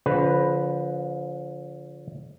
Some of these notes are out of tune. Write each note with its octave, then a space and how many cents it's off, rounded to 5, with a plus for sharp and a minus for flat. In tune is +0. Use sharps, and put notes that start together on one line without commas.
D3 -45 F3 +0 B4 +0